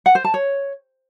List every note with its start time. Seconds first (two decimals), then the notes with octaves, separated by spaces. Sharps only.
0.06 F#5
0.15 C5
0.24 A5
0.34 C#5